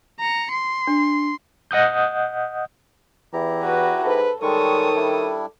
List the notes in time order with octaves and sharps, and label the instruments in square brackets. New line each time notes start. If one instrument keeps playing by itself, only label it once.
[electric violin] A#5 C#7
C6
[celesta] D4
[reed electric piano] D#5 F#5 D#6 G6
[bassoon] E2 [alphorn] E3 [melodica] E4 G4 A#5
[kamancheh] F#4 B4
[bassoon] G#2 [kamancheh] A4 [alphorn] B4
[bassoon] D#3 [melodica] G3 G#3 C#6 [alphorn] A4 [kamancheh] C#5 D#6
[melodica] G3 D4 E4